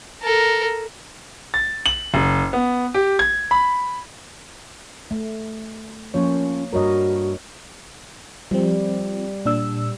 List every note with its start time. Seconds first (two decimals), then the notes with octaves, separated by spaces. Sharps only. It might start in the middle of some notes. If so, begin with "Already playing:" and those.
0.23 A4 A#4
1.54 A6
1.86 F#7
2.14 F#1
2.53 B3
2.94 G4
3.19 G#6
3.51 B5
5.11 A3
6.14 F3 A#3 C#4 C#5
6.73 G2 G3 F#4 A#4 C#5 D#5
8.51 F3 G3 C4
9.45 A#2 D4 E6